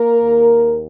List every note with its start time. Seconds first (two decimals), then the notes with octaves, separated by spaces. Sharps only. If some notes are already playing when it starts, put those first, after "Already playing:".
Already playing: A#3 A#4
0.20 D#2